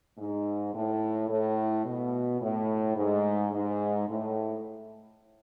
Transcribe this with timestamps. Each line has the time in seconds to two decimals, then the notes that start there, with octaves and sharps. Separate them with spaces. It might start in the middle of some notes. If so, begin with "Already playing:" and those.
0.18 G#2
0.74 A2
1.30 A2
1.86 B2
2.41 A2
2.96 G#2
3.53 G#2
4.09 A2